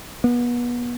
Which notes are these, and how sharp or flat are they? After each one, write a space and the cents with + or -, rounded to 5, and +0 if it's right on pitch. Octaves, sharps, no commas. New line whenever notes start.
B3 -30